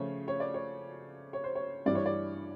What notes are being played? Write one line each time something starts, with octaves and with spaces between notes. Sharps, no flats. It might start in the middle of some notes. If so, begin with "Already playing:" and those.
Already playing: C#3 F3 A3 C#5
C#5
D5
C#5
C#5
C5
C#5
G2 E3 G3 D5
C#5
D5